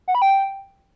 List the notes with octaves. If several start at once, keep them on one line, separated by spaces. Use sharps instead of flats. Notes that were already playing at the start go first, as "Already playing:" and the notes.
F#5
B5
G5